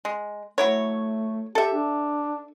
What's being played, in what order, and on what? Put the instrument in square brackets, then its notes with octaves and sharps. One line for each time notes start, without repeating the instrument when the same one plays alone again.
[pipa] G#3
[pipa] F#3 E4 C#5 [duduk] A3
[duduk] G4 [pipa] A4 E5
[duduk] D4